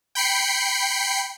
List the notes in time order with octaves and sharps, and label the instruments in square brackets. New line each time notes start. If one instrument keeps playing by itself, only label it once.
[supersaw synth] G5 B5 C7 C#7